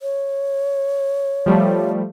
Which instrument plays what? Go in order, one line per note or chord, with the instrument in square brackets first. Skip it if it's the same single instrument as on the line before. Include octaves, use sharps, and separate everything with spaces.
[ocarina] C#5
[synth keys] F3 G3 A3